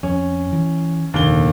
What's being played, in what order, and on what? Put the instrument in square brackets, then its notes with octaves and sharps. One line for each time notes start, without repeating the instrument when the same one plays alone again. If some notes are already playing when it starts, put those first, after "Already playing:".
[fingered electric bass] F2 [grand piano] C#4
[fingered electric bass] E3
[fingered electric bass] F1 A#2 [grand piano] D#2 D3 G7